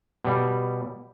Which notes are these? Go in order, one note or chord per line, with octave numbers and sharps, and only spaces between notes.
B2 G3